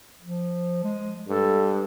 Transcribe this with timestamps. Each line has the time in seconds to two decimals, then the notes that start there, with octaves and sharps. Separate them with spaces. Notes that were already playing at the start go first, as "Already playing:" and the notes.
0.22 F3
0.84 G#3
1.28 G2 A4